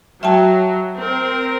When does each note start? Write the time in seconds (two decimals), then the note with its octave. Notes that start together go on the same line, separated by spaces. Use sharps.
0.23 F#3 E5 G5 A5
0.98 C4 A#4